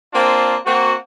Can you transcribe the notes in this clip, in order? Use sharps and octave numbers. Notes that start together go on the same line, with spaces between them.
A#3 C4 D4 F4
A#3 C4 F#4